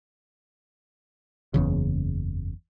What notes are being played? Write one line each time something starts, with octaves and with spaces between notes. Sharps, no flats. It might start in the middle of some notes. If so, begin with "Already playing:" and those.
F#1 E2 C#3